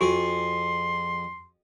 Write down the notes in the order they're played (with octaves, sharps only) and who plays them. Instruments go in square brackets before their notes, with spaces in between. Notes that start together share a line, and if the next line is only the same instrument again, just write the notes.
[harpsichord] F2 G#4 [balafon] F#4 [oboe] C6